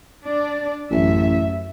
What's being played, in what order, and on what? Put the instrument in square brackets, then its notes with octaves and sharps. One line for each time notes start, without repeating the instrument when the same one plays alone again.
[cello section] D4 D5
[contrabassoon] A1 [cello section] F#2 E5